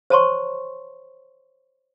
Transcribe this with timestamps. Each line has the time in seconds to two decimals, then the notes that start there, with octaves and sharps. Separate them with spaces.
0.10 C5 C#5 A5 A#5 C6 C#6